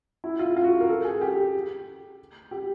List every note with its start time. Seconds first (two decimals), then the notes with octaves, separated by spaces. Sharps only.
0.24 E4
0.39 F4
0.56 F4
0.64 F#4
0.80 A#4
0.89 A4
1.05 G#4
1.22 G4
2.51 G4